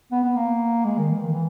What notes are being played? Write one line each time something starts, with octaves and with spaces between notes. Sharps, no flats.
B3
B3
A#3
G#3
D#3
E3
D#3
E3